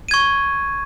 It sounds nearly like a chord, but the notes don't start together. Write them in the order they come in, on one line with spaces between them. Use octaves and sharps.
D#7 G#6 C#6